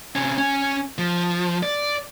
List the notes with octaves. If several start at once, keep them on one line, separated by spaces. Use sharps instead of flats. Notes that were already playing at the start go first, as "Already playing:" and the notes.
C3 C#4
C#4
F3
D5